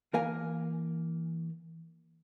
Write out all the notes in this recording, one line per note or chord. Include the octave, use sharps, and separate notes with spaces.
E3 A#3 A#4 F5 G#5